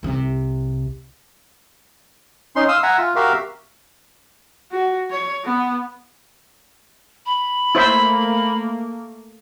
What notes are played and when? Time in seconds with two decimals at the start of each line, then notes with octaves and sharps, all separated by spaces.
0.03 C2 C3
2.56 C#4 D#4 C6
2.68 F5 C6 D#6 E6
2.83 E5 F#5 G#5 A#5
2.98 F4
3.16 F#4 G4 A#4 E5 F5
4.71 F#4
5.11 C#5
5.44 B3
7.26 B5
7.75 A3 A#3 E4 C5 E5